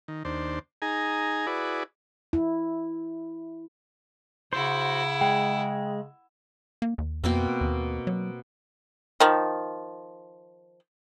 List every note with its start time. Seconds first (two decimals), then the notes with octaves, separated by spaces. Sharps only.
0.08 D#3
0.25 D#2 D4 C5
0.82 D#4 G#4 G#5 A#5
1.47 E4 F#4 G#4 B4 D5
2.33 E4
4.53 C#3 E4 F#4 C5 F#5
5.21 G#3 G5
6.82 A#3
6.98 D#2
7.24 F2 B2 A#3 C4
7.61 D#2
8.07 F#3
9.20 D#3 F3